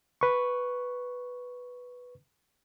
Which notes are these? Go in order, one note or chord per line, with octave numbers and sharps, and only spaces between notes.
B4 C#6